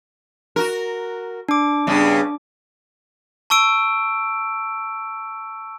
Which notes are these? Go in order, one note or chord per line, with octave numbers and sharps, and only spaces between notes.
F#4 A#4
D4 D6
G2 C#3 B3
A5 C#6 E6 D7